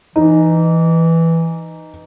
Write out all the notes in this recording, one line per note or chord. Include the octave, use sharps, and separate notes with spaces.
E3 D#4